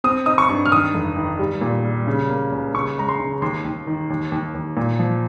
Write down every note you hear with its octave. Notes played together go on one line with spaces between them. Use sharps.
C4 D#6
D#4 D#6
C#6
G2
F6
D#3 D#6
F1
D#3
G3
A#2
G3
C#3
A#3
C#2
C#3 C#6
G#3 A#5
C6
C#3
D#2 C6
D#2
D#3
D#2
D#2
D#2
A#2
F3